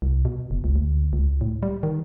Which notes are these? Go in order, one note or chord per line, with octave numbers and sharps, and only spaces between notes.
C2
B2
F#1
C#2
D2
C#2
A2
G3
D#3